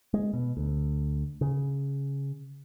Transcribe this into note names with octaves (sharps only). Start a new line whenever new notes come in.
G#3
B2
D2
C#3